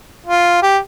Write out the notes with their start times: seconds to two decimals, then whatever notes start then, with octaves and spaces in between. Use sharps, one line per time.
0.26 F4
0.62 G4